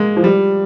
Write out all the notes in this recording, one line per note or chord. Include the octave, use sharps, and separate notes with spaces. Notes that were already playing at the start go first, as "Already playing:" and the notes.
Already playing: G#3 A#3
F3
G3